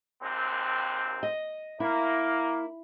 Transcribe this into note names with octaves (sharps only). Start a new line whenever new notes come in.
A#1 D#2 C4
D#5
A#3 E4